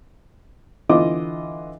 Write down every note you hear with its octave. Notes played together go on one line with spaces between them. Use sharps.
D3 E3 F4 D#5 D6